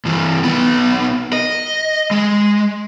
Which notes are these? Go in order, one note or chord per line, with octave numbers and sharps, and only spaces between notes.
G2 E3
B1 B3
D#5
G#3